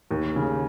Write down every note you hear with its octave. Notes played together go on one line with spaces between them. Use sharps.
D#2
C#3